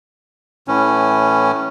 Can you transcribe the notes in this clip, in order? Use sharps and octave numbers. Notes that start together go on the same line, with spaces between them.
A2 E3 C#4